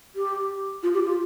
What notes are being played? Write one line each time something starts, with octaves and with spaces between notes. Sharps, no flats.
G4
F4
G4
F4